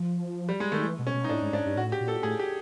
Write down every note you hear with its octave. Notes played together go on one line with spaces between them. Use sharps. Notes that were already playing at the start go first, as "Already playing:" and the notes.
Already playing: F3
G3
G#3
D#3 A3
E3
B2
C#4
B2
D#4
A2 D4
G#2
G#2 D4
G2
A2 F#4
G4
A#2
A4
A2 G#4
G4